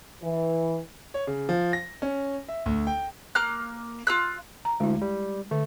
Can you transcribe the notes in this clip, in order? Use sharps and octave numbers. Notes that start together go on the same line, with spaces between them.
E3
C#5
C#3
F3
A#6
C#4
E5
D2
G5
A#3 F6 F#6
F4 E6 F#6
A#5
D2 G#3 E4
G3
D3 A3